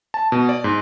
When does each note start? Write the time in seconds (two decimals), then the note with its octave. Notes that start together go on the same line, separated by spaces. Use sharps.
0.14 A5
0.32 B2
0.49 D5
0.64 G#2